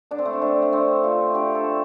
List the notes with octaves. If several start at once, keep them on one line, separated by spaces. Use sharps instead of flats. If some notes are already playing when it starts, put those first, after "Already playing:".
D3 D4
C4
A3
C4
A3 D4
A3
D3 C4
A3 F4
D3 G4
A4
A3